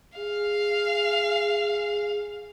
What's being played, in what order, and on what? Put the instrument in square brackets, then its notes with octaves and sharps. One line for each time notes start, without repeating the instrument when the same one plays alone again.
[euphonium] G#4 [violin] F5